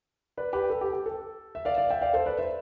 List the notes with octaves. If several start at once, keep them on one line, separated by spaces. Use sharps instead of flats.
B4 D5
G4 B4
A4
G4
G4
A4
E5
D5 F5
D5 F5
E5 G5
D5 F5
A4 C5
B4 D5
C5 E5